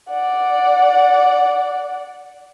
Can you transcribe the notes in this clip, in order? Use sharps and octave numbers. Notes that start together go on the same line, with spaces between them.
D5 F#5